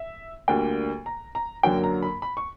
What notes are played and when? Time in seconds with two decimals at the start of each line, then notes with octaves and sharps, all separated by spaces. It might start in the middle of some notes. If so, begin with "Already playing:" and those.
Already playing: E5
0.48 D2 D3 G3 A#3 G5
1.06 A#5
1.35 A#5
1.63 F#2 D3 F#3 A#3 G5
1.84 A#5
2.02 B5
2.22 B5
2.37 C#6